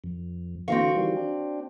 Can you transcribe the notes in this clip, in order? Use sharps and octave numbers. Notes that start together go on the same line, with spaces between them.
F2
D3 E3 C4 F#4 F5 C#6
D#3 E3 G3
D4